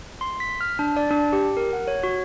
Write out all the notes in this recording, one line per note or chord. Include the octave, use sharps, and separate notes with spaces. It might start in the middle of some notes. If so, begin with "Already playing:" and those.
C6
B6
F6
D4
D5
D4
G4
A#4
F#5
C#5
F#4